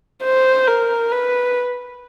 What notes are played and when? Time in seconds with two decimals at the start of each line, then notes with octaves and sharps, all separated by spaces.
0.23 C5
0.68 A#4
1.12 B4